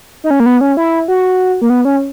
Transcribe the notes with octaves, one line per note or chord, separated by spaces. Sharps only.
D#4
C#4
A#3
B3
C#4
E4
F#4
A#3
B3
C#4